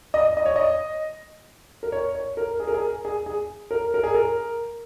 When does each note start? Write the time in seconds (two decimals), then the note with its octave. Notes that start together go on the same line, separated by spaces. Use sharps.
0.14 D#5
0.37 D#5
0.45 C#5
0.56 D#5
1.83 A#4
1.92 C#5
2.15 C#5
2.37 A#4
2.60 G#4
2.67 A#4
2.74 G#4
3.05 G#4
3.26 G#4
3.71 A#4
3.94 A#4
4.04 G#4
4.14 A#4